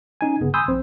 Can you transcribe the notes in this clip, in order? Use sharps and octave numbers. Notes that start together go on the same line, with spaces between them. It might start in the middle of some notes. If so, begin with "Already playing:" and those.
C#4 D#4 G#5
G1 C#3 B3 G#4
G#5 B5 C6 D#6 E6 G6
A#1 C4 C5